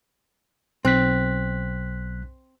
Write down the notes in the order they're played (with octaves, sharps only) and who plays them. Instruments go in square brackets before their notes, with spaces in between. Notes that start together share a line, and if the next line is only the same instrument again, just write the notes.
[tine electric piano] B1 F#6 B6 [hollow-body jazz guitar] C4